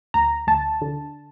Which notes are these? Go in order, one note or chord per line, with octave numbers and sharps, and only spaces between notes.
D2 A#5
D2 A5
D3